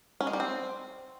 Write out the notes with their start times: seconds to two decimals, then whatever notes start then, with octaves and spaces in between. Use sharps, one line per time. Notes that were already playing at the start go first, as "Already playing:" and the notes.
0.21 C#4
0.27 G#3
0.33 G3
0.40 C4